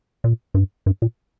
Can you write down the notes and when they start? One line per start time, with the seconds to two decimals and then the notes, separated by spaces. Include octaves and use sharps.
0.24 A#2
0.54 G2
0.86 G2
1.02 A#2